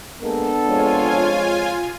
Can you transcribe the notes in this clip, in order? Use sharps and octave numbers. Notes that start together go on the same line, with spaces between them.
G#3 A#3 B3 D4 A4
F2 G#3 F4 C#5 G#5